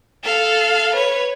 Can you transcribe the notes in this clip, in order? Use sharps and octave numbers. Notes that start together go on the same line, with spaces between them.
A4 F5
B4 C#5